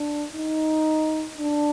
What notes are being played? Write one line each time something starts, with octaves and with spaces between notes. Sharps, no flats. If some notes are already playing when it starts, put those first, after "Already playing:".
Already playing: D4
D#4
D4